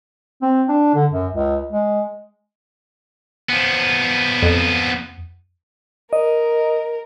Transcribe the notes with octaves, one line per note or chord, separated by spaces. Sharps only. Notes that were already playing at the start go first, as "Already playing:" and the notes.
C4
D4
D3
F#2
C#2
G#3
F3 B3
F2
A#4 D#5